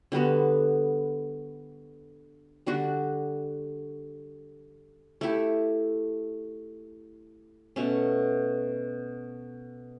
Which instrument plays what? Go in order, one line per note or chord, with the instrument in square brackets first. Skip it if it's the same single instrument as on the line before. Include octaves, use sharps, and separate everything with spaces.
[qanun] D3 G3 B3 F#4
D3 G3 D4 F#4
A3 E4 G4
B2 A3 C#4